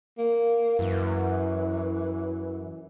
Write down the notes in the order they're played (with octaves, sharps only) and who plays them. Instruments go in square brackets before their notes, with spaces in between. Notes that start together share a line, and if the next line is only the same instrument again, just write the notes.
[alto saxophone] A#3
[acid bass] F#2 [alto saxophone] E3